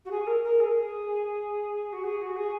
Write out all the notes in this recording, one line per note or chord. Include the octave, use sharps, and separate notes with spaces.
F#4
G#4
A#4
A#4
G#4
F#4
G#4
F#4
G#4